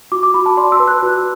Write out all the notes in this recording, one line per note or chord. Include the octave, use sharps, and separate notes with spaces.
F#4 D6
D6
F#4 B5
A5
D5 C6
E6
B4
F#6
F#4